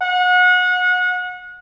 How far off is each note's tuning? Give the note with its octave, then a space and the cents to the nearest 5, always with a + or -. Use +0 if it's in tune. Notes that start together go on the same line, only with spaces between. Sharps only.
F#5 -30